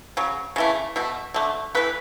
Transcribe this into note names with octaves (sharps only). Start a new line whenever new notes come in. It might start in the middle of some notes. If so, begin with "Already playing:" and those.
C#3 F#3
C#3 E3 A3
B2 A3
D3 A3
E3 A3 B4